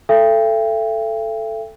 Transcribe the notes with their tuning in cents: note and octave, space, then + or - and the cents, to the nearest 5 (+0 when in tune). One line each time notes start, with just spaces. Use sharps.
A4 +0 E5 +40 G5 +25